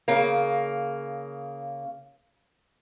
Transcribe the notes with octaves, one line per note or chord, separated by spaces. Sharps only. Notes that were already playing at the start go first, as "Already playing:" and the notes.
C#3 A#3